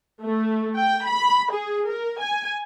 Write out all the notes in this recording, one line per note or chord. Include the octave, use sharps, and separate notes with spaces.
A3
G5
B5
G#4
A#4
G#5